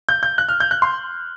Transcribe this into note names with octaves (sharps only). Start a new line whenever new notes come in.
G6
G6
F#6
F6
G6
F#6
C6